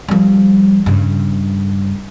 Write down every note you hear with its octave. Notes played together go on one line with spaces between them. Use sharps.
F3 G3
G2 C#3